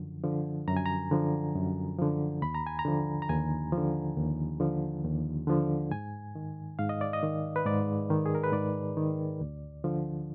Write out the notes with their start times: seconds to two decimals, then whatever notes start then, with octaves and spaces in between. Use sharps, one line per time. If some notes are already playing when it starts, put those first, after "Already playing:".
Already playing: F#2 D3 F3
0.24 D3 F3
0.68 F#2 A#5
0.77 G#5
0.86 A#5
1.11 D3 F3
1.55 F#2
1.99 D3 F3
2.42 D#2 B5
2.55 A#5
2.67 G#5
2.79 A#5
2.85 D3 F3
3.22 A#5
3.29 D#2 G#5
3.72 F3
3.77 D3
4.17 D#2
4.60 D3 F3
5.04 D#2
5.47 D3 F3
5.91 G#2 G#5
6.35 D#3
6.79 G#2 F5
6.89 D#5
7.01 D5
7.13 D#5
7.22 D#3
7.56 B4
7.65 G#2 D5
8.10 D#3
8.26 G#4
8.35 A#4
8.44 B4
8.52 G#2 D5
8.97 D#3
9.41 D2
9.84 D3 F3